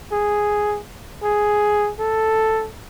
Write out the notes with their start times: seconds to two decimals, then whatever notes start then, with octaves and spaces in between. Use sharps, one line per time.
0.12 G#4
1.23 G#4
1.99 A4